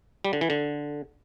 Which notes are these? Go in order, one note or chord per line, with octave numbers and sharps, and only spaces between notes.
G3
D3
E3
D3